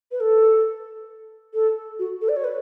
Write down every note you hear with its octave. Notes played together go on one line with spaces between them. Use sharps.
B4
A4
A4
F#4
A4
D5
C#5
B4